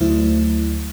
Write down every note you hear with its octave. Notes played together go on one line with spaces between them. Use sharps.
D2 F#3 A3 E4 C5